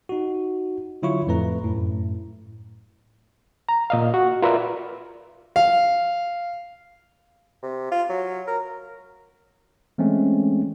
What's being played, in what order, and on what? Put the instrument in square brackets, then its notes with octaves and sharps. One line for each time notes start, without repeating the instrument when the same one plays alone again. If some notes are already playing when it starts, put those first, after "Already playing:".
[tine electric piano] D#4 F#4
D3 F#3 E4 F4 C#5 C#6
F2 A2 A3 B4 A#5
F#2 A2
[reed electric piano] A#5
A#2 D#5 F5
F#4
F4 A#4 B4 D5 E5 F5
[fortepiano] F5
[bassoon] C3
F4
F#3
A#4
[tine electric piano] E3 G#3 A3 C4 C#4